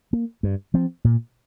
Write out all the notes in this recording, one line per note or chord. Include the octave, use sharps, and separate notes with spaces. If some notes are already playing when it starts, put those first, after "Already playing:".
A#3
G2
F3 C4
A#2